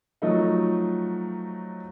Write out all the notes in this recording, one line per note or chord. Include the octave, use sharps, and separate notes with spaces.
F3 F#3 A3 D#4